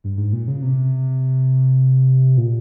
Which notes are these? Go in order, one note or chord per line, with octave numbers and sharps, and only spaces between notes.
G2
G#2
A#2
C#3
C3
A#2